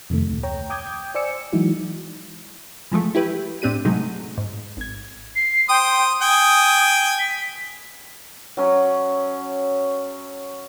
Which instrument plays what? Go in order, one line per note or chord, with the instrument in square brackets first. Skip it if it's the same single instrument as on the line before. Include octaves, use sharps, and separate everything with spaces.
[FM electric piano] F2 C3 D#3 A3
D2 A#2
C#5 G5 A#5
G5 D6 D#6 G6 G#6
C5 D5 G#5 D6 E6 C#7
E3 F#3 G#3 D#4 E4 F#4
[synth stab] E3 F3 G#3 A3
E4 G4 B4
A2 C4 D4 G4 D#7
C3 F#3 G#3 A3 D#4
G#2
G#1 G#6
[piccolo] C7
[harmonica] C5 D#6 [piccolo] G5
[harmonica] G5 G#5 [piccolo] D#6
[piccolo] B6
[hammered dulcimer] F#3 C#4